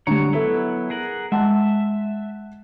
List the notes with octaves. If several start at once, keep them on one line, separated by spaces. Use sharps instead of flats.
D3 F#3 G3 C#5 A#5
F#3 B3 E4 A4 E5
G#4 A#4 F#5
G#3 E5 F#5 A5